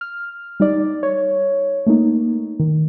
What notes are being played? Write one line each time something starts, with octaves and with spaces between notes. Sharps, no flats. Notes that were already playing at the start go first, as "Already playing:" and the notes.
F6
G3 D#4 D5
C#5
A3 A#3 D#4
D#3